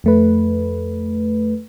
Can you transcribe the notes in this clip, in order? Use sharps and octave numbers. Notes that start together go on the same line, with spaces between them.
F2 A3 B4